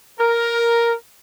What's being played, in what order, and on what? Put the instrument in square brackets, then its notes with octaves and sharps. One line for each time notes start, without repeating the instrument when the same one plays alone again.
[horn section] A#4